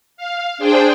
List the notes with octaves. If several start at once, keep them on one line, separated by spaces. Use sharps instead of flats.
F5
D4 G#4 C5 G5